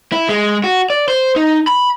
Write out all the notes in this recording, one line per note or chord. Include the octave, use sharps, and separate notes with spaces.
E4
G#3
F#4
D5
C5
D#4
B5